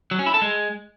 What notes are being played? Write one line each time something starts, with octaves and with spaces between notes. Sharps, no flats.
F#3
C#4
E4
A4
G#3